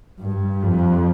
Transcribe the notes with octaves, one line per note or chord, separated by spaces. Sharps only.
G2
F2